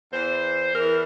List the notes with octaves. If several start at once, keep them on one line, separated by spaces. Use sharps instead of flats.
E2 E3 C5
E2 E3 A#4